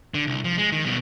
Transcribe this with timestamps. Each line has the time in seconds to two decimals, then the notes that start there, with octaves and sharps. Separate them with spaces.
0.14 D3
0.27 C2
0.44 F3
0.58 G#3
0.72 D#3
0.85 B2 G3